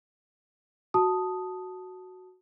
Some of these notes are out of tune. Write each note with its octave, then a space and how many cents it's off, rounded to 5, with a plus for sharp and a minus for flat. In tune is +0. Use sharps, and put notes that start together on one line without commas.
F#4 +0 A5 +0 D#6 +0